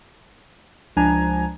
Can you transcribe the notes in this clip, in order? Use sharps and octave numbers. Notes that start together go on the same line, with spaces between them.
C#2 F3 D4 G#5 A#5 G#6